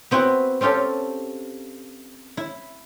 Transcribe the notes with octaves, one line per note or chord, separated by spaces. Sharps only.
B3 C4 E4 F#4
C4 C#4 F4 G4 A4
E4